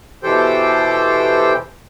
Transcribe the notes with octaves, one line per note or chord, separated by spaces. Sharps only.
B2 E3 G4 A4 C5 G5